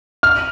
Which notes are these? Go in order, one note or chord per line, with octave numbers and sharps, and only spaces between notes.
F6